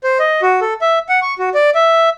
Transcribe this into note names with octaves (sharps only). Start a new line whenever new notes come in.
C5
D#5
F#4
A4
E5
F#5
C#6
F#4
D5
E5